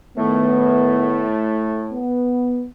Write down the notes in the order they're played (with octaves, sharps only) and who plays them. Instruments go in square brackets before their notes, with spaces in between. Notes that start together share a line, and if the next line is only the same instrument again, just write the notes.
[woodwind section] A2 A3 [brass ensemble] D#3 B3
[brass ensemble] B3